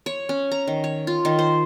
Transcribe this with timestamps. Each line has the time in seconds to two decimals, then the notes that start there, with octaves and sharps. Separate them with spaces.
0.06 C#5
0.29 C#4
0.52 A#5
0.67 D#3
0.84 C#5
1.07 F4
1.25 D#3
1.39 C5